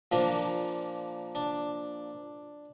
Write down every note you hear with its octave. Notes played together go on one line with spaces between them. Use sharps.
A#2 F3 A#3 D4
D4